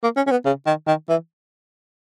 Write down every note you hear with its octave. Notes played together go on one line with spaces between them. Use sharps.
A#3
C#4
C#4
B3
C#3
D#3
D#3
E3